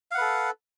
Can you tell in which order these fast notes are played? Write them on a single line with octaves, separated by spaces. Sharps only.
F5 F#5 B4 A4